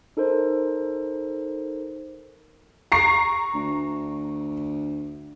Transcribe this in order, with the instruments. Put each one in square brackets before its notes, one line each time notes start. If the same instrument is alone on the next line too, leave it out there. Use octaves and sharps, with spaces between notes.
[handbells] D#4 A4 A#4 C5
[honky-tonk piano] A#5 C#6 C7
[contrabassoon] D2